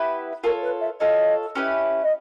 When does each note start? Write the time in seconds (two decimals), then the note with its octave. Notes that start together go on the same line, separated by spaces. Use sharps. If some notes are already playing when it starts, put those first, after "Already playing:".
Already playing: B3 E4 G4 B4
0.43 F4 A4 A#4 C#5
0.63 B4
0.80 E5
1.00 F4 A4 C#5 D#5
1.55 C#4 E4 G4 B4
2.03 D#5